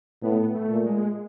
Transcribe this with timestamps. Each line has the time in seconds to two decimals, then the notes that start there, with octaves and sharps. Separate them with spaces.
0.22 A2 B3
0.55 A3
0.70 A#2
0.86 G#3